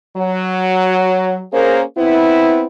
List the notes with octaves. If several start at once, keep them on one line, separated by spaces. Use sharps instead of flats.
F#3
A#3 C#4 G#4 A#4 C5
B3 C4 E4